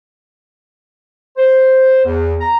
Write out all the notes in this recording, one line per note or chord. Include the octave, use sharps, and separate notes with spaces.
C5
E2
A#5